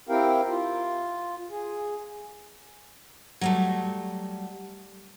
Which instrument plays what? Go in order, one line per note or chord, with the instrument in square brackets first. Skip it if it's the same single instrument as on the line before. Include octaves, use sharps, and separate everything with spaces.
[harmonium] C4 E4 G4 A#4 F5 G5
F4
G#4
[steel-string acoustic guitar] F#3 G3 A3